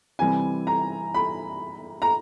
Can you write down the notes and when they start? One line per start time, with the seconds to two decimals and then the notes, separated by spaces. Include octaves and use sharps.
0.19 C3 E3 G3 C4 G#5
0.67 A#5
1.14 B5
2.02 A#5